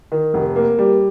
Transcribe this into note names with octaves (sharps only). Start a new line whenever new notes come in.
D#3
F1
A#3
G3